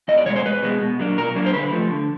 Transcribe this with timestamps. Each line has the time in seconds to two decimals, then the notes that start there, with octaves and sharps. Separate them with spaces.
0.08 E2 D#5
0.18 D5
0.26 B2 G#3 C#5
0.36 C5
0.45 E2 B4
0.63 B2 G#3
0.81 B2
0.99 F#3 A#3 D4
1.18 B2 A#4
1.35 F#3 A#3 D4
1.46 C5
1.53 D3 B4
1.73 F3 A3
1.91 D3